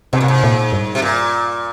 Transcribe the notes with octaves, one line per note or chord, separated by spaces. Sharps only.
G#2 C3
A#2
G#2
A#2
G2
C3
A#2